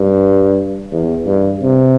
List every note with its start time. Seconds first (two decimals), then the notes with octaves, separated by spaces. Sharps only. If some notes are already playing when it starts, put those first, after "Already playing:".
Already playing: G2
0.92 E2
1.26 G2
1.62 C3